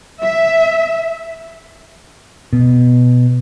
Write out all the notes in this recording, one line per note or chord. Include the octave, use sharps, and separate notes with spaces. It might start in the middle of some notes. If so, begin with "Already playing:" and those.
E5
B2